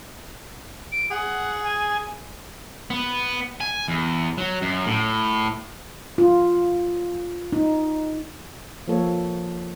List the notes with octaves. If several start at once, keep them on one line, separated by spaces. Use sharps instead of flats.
D7
G#4 F#5
G#5
B3
G#5
E2
F#3
F#2
A2
F4
D#4
F3 A#3 A4 C#5